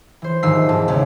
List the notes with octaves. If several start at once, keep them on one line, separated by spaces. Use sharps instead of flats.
E3 C5
D#1 G#2 D#3 F5 E6 C7
E1 G#2 A5
G#1 C#3 C#4